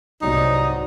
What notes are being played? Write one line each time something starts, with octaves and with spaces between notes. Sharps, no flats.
C2 G#2 C3 F#3 D#4 F#4 D5